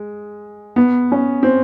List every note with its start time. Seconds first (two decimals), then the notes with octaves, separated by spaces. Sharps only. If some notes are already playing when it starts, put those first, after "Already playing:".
Already playing: G#3
0.76 B3
1.12 C#4
1.43 C4